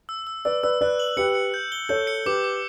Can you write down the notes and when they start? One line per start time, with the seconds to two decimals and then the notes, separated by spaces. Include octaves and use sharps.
0.09 E6
0.27 E6
0.45 B4 D5 E6
0.63 B4 D5 E6
0.81 B4 D5 F#6
1.00 F#7
1.17 G4 B4 C#7
1.35 C#7
1.54 G6
1.72 G7
1.89 A4 C#5 G6
2.07 C#7
2.26 G4 B4 D6
2.44 D6